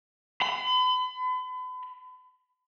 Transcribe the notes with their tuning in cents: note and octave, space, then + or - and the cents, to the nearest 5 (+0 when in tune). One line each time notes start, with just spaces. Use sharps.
B5 +40